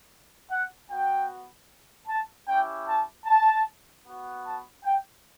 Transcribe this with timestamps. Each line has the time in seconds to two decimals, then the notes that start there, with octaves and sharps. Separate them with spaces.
0.50 F#5
0.89 B3 F#4 G5
2.08 A5
2.47 C#4 E4 G4 G5
2.87 A5
3.26 A5
4.04 B3 F#4
4.44 A5
4.83 G5